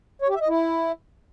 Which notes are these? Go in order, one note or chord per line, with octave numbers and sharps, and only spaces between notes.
C#5
G4
E5
D#5
E4